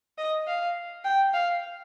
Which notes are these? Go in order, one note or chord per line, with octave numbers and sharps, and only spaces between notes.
D#5
F5
G5
F5